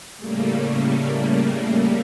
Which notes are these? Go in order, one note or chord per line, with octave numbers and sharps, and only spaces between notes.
A2 C#3 G3 A3 A#3